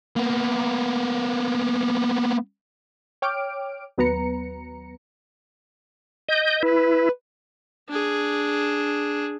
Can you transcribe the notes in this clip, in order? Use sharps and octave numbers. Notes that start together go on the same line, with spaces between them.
A#3 B3
C#5 G5 D6 F6 D7
D#2 F#3 B3 B4 A#5 C#7
D#5 G6
E4 B4
D4 G#4